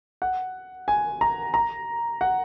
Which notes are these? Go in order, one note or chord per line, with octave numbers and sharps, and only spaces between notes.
F#5
G#5
A#5
A#5
F#5